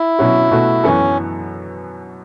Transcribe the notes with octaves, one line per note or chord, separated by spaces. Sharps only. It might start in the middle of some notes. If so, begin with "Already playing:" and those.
Already playing: E4
B2 F#3 C#4 F#4
B2 A3 F#4
F#2 E3 B3 C#4 F#4 A4